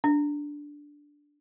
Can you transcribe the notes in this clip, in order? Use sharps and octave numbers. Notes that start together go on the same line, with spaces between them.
D4